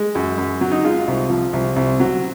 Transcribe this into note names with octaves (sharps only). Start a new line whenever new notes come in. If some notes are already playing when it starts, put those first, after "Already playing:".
Already playing: G#3
F#2
F#2
F#3
D#4
G#3 F4
C2
F3
C2
C2
F#3